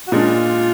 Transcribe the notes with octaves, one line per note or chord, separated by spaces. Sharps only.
F#4
A#2 G#3 D4 F4